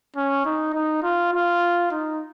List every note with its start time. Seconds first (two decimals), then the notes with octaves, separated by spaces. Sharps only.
0.16 C#4
0.45 D#4
0.74 D#4
1.03 F4
1.33 F4
1.91 D#4